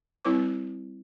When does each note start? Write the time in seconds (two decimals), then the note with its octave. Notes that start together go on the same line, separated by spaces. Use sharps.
0.25 G3 C4 E4 B4 C#5 D6